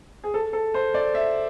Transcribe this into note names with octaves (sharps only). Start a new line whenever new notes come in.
G#4
A4
A4
C5
D5
E5